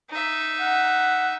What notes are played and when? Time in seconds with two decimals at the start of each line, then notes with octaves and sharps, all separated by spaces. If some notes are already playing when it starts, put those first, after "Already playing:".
0.10 D#4 E5
0.61 F#5